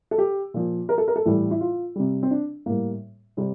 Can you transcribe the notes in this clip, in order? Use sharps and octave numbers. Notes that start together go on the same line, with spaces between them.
A4
G4
A#2 F3
A#4
A4
A#4
A4
A2 E3 G3
E4
F4
C3 G3
C4
D4
A2 G3 A#3
C3 G3 C4